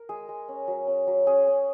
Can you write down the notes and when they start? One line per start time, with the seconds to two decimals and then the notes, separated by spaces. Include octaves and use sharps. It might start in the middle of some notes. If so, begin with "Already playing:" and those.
Already playing: A#4
0.09 G#3 G#4
0.29 G#3
0.48 C#4
0.67 F#3
0.87 C#4
1.07 F#3
1.27 C#4 G#4
1.47 C#4